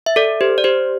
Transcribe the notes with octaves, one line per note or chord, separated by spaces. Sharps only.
E5
A4 D5
G4 C5
D5
G4 C5